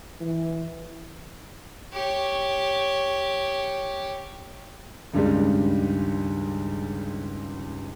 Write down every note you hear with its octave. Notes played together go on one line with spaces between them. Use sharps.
E3
G4 C#5
C#2 G2 D#3 G3 G#3